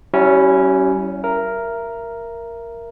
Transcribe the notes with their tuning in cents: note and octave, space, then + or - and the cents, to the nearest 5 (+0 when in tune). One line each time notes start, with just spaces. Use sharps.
G3 -45 C#4 +0 E4 +0
A#4 +0 E5 +25